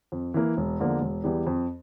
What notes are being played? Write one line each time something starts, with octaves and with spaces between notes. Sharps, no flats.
F2
E3 A#3
E1
E2 D3 F3 A#3
E1
E2 E3 G3
F2